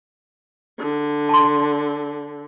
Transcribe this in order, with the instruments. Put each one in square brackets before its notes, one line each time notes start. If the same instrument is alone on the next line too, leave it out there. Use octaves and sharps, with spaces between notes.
[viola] D3
[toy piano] A5 C6